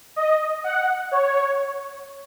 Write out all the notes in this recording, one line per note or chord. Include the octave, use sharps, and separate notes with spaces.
D#5
F#5
C#5